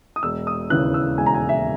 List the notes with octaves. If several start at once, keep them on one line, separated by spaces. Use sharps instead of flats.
D#6
E1 E6
D#6
D#2 C#3 E3 F#6
E6
E1 G#5
A#5
G#5
E5